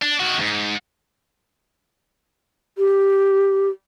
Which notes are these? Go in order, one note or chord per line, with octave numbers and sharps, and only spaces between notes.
D4
D#3 F#4
E2 G#2
G4